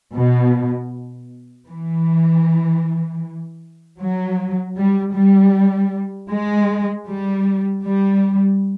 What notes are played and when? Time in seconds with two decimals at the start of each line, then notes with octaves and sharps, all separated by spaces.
0.14 B2
1.68 E3
3.99 F#3
4.76 G3
5.15 G3
6.31 G#3
7.08 G3
7.84 G3